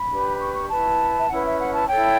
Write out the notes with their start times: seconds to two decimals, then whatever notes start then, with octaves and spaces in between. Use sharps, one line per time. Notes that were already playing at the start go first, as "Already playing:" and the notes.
Already playing: B5
0.10 D4 G4 B4
0.40 C#6
0.55 C#6
0.70 E4 B4 A5
1.19 E5
1.30 C#4 E4 B4 F#5
1.45 E5
1.59 F#5
1.74 A5
1.88 E4 A4 C#5 G5